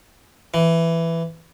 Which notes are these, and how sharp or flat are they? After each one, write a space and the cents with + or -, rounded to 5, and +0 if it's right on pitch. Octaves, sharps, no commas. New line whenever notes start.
E3 +10